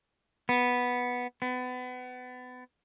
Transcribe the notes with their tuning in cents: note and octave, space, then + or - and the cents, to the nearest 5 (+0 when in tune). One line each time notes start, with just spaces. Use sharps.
B3 -5
B3 +30